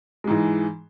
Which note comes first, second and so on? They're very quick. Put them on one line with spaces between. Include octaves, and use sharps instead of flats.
G#3 G#2 E3